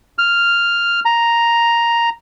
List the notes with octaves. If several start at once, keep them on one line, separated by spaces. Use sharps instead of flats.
F6
A#5